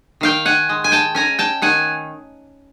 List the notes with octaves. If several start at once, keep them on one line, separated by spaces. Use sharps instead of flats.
D#3 F5 G5
F#5 G#5
G#3
G#5
G5 A5
C#4 G#5 A#5
G5 A5
D#3 F#5 G#5